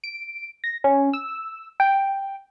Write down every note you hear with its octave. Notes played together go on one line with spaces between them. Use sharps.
D7
A#6
C#4
E6
G5